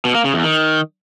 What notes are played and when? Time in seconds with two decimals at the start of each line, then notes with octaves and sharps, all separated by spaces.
0.05 B2
0.15 A#3
0.24 C#3
0.34 E2
0.44 D#3